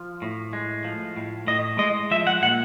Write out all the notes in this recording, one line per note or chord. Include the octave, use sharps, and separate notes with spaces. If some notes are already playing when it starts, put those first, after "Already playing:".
Already playing: F3
A2
G#3
F3
A2
A2 D#5
G#3 D#5
F3 E5
F#5
A#2 F#5